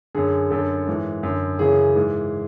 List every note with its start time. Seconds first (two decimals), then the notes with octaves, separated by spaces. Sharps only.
0.15 F#2 D3 G#4
0.50 F#2 D3 A4
0.87 G#2 E3
1.23 F#2 D3
1.59 F#2 C#3 E3 G#4
1.95 G#2 E3